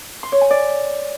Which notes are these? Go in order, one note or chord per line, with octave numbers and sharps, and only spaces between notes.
C6
C#5
G#5
D5